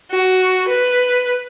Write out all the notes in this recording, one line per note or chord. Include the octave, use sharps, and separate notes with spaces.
F#4
B4